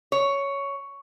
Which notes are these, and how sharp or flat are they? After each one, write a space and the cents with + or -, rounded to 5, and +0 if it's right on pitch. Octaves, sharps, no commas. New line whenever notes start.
C#5 +10